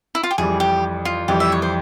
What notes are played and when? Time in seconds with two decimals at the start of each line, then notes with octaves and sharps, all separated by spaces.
0.15 E4
0.23 F4
0.31 G4
0.38 F2 E3 G3 G#4
0.60 G4
1.05 F4
1.28 F2 E3 G3 G4
1.40 E5
1.52 C#5
1.62 C5